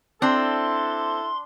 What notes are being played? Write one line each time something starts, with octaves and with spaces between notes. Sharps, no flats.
C4 D4 E4 A4 C6